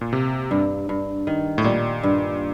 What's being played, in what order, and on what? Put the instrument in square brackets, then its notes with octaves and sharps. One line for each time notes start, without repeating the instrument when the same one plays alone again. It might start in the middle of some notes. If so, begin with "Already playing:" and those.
[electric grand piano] A#2
[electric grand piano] C3 [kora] A#3
[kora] G2
G2
D#3
[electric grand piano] A2
[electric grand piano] A#2 [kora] G3
[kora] G2